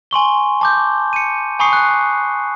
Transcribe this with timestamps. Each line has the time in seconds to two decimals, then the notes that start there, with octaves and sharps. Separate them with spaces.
0.11 G#5 C6 C#6 G7
0.61 A5 D6 G6
1.13 C#7 D#7
1.59 G#5 B5 C#6 D#6 C7 C#7
1.73 F#6